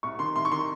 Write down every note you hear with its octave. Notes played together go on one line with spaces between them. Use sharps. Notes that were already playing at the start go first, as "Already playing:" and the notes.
C2 C#6
D#3 C6
C2 C6
C#6
D#3 C6